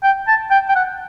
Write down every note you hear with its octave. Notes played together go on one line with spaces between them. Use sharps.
G5
A5
G5
G5
F#5